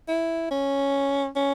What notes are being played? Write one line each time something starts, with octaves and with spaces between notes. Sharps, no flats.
E4
C#4
C#4